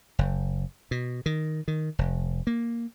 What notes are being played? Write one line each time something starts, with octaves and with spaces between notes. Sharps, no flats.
F#1
B2
D#3
D#3
F1
A#3